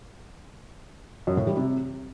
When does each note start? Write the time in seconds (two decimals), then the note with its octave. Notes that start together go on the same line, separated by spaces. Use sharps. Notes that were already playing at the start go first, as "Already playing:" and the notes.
1.27 F#2
1.37 A2
1.47 G3
1.57 C3